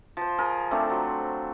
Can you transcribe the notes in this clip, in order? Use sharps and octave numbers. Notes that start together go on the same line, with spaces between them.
F3 C5
G#4 A#4
A3 C4 D4
F#3